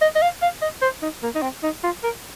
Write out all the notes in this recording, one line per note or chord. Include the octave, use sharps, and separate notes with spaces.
D#5
D#5
F5
F5
D#5
C5
D#4
A#3
D#4
C4
D#4
F4
A#4